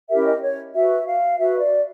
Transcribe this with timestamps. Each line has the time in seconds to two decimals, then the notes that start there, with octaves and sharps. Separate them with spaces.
0.10 C#4 E4 G4 A#4 E5
0.27 D#5
0.42 C#5
0.74 F#4 B4 E5
1.06 F5
1.38 F#4 B4 E5
1.59 D5